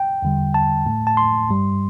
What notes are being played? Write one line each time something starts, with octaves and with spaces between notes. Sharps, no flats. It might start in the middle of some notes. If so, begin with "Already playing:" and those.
Already playing: G5
E2 D3 G3
A5
A2 A3
A5
C6
G2 G3